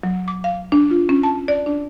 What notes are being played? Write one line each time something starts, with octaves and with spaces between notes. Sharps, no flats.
F#3
D6
F5
D4
F4
C#4
A5
D5
D4